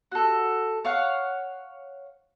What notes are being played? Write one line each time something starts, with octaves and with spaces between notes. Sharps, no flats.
F#4 A4
C#5 F5 F#5